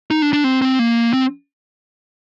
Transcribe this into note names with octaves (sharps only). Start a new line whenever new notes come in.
D#4
D4
D4
C4
C4
A#3
C4